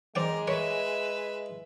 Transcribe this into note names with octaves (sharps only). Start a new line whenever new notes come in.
G#3 C4 A#4 D5 G5
A#4 B4 C#5 E5